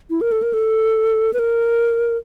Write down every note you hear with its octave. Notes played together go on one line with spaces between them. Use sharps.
E4
A#4
A4
A#4
A4
B4
A#4